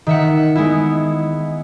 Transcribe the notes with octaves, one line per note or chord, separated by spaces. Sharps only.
D#3 E5 F#5
G#3 B3 E4